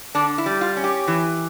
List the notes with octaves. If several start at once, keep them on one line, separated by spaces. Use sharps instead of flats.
D3 D4
E4
G3
F4
C#4
G4
E3